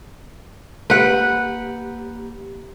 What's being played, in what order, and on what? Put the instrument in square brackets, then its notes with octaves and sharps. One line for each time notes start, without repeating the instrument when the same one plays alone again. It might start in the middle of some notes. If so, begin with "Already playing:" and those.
[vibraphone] A#3 G4 [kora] B4 F#5